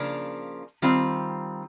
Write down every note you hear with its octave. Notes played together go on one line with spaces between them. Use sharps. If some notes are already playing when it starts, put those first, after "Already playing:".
Already playing: C#3 F3 A#3 D4
D#3 G3 C4 F4